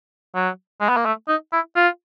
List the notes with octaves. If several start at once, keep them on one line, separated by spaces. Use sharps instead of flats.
F#3
G#3
B3
A#3
A3
D#4
E4
F4